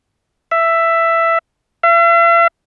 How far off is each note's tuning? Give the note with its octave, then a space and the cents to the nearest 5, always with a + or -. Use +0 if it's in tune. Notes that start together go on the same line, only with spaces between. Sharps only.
E5 +10
E5 +45